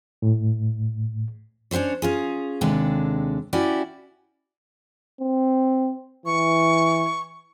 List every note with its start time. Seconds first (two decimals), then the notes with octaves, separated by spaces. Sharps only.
0.22 A2
1.71 C#4 D4 G4 C5 C#5
2.02 C#4 F4 G#4
2.61 D#2 C3 G#3 D4 A4
3.53 C#4 E4 F#4 G4 D5
5.21 C4
6.26 E3 C#6